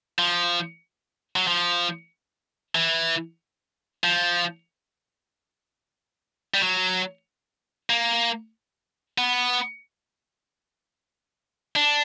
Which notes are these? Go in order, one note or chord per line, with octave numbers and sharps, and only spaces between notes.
F3
F#3
F3
E3
F3
G3
F#3
A#3
B3
D4